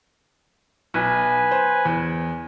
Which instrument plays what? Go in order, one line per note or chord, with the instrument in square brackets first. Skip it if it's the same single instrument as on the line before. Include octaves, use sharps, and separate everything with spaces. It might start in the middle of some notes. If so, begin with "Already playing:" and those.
[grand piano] B1 [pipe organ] B4 G#5
[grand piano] C5
E2